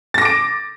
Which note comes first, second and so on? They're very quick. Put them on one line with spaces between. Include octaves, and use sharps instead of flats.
A6 A#6 D6 D7